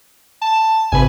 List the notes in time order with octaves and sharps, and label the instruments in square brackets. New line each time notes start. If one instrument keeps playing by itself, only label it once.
[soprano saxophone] A5
[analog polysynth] G#1 C3 B4 [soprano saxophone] G#5